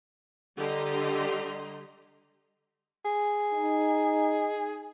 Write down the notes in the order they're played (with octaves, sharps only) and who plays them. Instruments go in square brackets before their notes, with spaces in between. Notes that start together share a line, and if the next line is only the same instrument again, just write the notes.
[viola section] D3 G3 G4 D#5 A#5 C6
[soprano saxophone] G#4
[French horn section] D#4